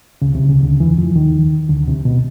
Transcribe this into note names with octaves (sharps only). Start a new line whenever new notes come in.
C#2 C#3
C2 C3
C#2 C#3
D2 D3
E2 E3
F2 F3
D#2 D#3
D2 D3
C2 C3
B2